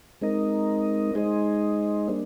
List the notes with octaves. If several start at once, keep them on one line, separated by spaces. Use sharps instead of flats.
G#3 C4 D#4 A#4 D#5
G#3 D#4 G#4 C5 D#5
G3 A#3 D4